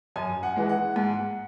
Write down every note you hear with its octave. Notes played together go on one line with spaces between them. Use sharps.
F#2 G#5
F#5
E3 G#3
F#5
G#2